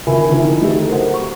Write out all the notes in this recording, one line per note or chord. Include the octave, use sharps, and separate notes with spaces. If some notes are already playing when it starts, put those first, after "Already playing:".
D#3 F4 A#4 E5 G#5 B5
D3 D#3 F3 D#4 E4 A#4
F#3 A3 D#4 F#4 G4 A4
A#4 C5 F#5
C#6